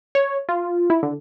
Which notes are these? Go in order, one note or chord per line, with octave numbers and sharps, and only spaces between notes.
C#5
F4
E4
D3